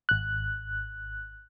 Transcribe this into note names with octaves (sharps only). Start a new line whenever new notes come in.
G#1 F#6